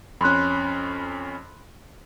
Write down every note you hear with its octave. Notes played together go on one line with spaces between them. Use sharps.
F2 C#4 B5 C6 F#6